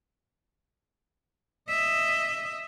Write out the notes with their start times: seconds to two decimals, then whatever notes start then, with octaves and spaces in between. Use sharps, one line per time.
1.69 D#5 E5